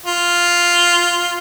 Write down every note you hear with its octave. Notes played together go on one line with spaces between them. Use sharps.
F4